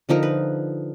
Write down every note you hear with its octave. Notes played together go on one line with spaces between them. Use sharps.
D3 F3 D#4 A#4
B4